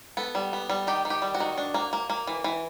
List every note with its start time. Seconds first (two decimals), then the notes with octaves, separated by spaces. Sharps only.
0.17 B3 A4
0.35 G3
0.53 B3
0.70 G3
0.87 D#3 G4
1.05 D#3
1.10 G4
1.22 G3
1.35 F#4
1.40 D#3
1.57 D4
1.74 A#3
1.93 A#3
2.10 A#3
2.27 E3
2.44 E3